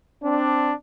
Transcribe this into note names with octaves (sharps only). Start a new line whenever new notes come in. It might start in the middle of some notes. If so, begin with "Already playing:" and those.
C4 D4